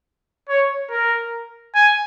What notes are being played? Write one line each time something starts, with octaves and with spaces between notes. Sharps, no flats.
C#5
A#4
G#5